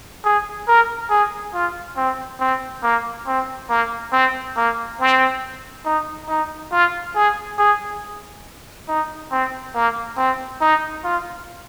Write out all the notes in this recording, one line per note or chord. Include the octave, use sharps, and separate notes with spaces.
G#4
A#4
G#4
F4
C4
C4
A#3
C4
A#3
C4
A#3
C4
D#4
D#4
F4
G#4
G#4
D#4
C4
A#3
C4
D#4
F4